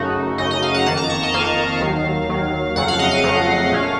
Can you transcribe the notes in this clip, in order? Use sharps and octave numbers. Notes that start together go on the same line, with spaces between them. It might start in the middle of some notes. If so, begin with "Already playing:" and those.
Already playing: F#2 C#3 A3 D#4 F#4
F#2 C#3 A3 D#4 D#5
D#5
F5
F#5
F2 D#3 A#3 A5
A#5
C#6
D#5
F2 D#3 A#3 F5
D#2 D#3 F#3
D#2 D#3 F#3
F2 C#3 F#3 A3 F#5
F5
D#5
F5
F2 C#3 F#3 A3
A#2 A3 C#4